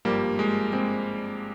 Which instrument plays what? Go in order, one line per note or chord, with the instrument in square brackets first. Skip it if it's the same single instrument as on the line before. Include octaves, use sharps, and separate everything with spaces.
[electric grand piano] G#1 G2 F3 G3 A#3
G#3
G#3 C4